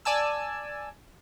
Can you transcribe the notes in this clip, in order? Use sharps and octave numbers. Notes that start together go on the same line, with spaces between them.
D5 G#5 A5 E6